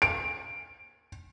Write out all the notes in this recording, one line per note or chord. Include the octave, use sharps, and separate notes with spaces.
D7